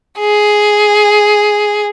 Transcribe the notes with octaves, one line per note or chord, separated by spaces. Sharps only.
G#4